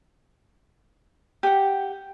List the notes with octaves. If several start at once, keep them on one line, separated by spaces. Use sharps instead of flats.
G4 F#5